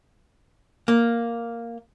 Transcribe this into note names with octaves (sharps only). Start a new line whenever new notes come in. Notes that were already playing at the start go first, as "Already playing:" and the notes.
A#3